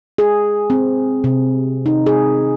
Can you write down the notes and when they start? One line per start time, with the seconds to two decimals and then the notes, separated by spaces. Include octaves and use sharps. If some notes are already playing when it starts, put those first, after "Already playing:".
0.18 G#4
0.70 C4
1.24 C3
1.86 D#4
2.06 G#4